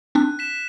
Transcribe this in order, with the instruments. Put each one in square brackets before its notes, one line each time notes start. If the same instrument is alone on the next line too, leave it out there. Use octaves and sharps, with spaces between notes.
[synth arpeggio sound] C4 D4 [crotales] F#6
[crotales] B6 E7